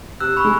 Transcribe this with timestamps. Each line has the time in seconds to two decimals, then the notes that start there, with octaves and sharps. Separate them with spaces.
0.20 C3 E6 F#6
0.36 B5 C#6
0.45 G#3